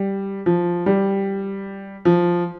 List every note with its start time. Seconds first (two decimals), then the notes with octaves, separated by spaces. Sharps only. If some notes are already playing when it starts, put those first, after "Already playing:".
Already playing: G3
0.46 F3
0.86 G3
2.05 F3